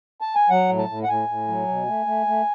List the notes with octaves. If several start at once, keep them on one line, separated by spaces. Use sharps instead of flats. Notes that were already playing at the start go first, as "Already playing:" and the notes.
A5
G#5
F#3 F#5
A2
A5
A2
F#5
A2 G#5
A2
F#3
B2
A3
A3
A3